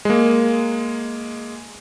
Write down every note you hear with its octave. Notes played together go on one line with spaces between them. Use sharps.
G#3 A#3